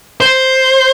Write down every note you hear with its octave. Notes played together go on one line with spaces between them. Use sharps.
C5